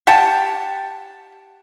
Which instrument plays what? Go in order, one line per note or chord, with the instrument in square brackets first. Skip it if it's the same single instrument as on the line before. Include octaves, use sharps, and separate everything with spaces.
[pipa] G4 F#5 G5 A5